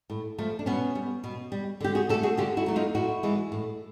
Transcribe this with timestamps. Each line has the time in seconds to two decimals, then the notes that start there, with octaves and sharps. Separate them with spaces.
0.10 A2
0.38 F3 A3
0.59 D4
0.66 B2 B3 C#4
0.95 G3
1.24 B2
1.52 G3
1.80 D3 G4
1.95 F#4 G#4
2.09 F#3 G4 A4
2.14 A3
2.23 F#4 G#4
2.38 D3 F4 G4
2.57 E4 F#4
2.66 F#3 A3
2.76 D#4 F4
2.95 A2 E4 F#4
3.23 E3 G#3
3.52 A2